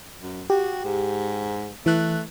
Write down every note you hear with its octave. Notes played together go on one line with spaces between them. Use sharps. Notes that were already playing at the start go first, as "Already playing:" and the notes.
F#2
F#4 G4
G#2
E3 A3 F#6